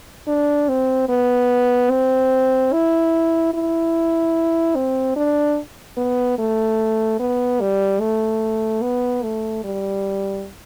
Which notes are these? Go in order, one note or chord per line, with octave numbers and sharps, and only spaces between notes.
D4
C4
B3
C4
E4
E4
C4
D4
B3
A3
B3
G3
A3
B3
A3
G3